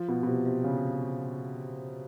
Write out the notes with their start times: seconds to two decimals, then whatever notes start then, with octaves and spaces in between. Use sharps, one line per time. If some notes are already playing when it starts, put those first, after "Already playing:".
Already playing: F3
0.08 B2
0.23 B2
0.27 C3
0.46 C3
0.64 C#3